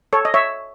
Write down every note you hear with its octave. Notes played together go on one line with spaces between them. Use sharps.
A4 C#5
D#5
C#5 E5